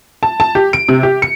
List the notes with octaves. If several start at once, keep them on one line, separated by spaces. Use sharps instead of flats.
A5
A5
G4
D7
C3
G4
C#7